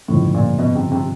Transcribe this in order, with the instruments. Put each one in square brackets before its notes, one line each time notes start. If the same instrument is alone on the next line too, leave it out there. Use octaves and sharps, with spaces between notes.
[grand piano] G1 F2 C#3 F3 [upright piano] A2
[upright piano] A#2
B2
C3
C3